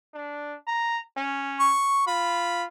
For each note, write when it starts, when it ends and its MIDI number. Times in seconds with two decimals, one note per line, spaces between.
0.14 0.55 62
0.67 1.00 82
1.17 1.73 61
1.59 2.03 85
2.07 2.66 65
2.07 2.63 83